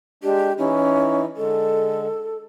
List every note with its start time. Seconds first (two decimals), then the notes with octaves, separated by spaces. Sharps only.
0.23 G#3 D4 G4
0.59 E3 C#4 D#4 E4
1.37 D3 G#3 A4